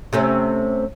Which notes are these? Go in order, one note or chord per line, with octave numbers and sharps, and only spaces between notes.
C3 A3 C#4